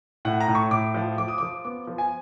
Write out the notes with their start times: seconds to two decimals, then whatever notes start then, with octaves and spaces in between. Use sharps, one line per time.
0.25 A2 F#5
0.40 A#5
0.48 A2
0.55 C#6
0.71 A2 D6
0.94 F3
1.18 F3 D6
1.28 D#6
1.38 F3 D6
1.65 B3 D6
1.87 F3
1.98 G#5